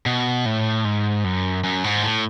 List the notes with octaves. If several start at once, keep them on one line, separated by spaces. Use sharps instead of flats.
B2
A2
G#2
F#2
F#2
G#2
A2